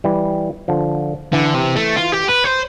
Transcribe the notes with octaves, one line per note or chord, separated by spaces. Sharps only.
E3 G3
D3 F3
D3 E3
C3
A3
F4
G4
B4
C5